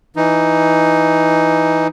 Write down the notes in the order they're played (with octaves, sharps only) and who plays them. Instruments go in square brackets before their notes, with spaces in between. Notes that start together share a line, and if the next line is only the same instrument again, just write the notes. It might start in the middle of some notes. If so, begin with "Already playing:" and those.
[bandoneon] E3 D#4